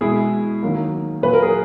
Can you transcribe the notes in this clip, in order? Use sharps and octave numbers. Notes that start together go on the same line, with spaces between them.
B2 G#3 E4 G#4
D#3 F#3 A#3
A#2 F#3 A#3 B4
A#4
G#4